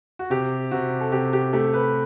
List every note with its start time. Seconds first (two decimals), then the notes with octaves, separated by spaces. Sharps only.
0.19 F#4
0.30 C3 G4
0.71 C3 F#4
1.01 A4
1.12 C3 G4
1.33 G4
1.53 A3 G4
1.74 B4